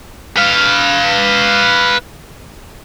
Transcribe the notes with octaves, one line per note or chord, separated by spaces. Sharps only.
B4 F5